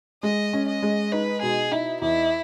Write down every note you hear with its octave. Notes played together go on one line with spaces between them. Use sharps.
G#3 D#5
C#4
D#5
G#3
D#4 B4
B2 G#4
D#4 E4
E2 E4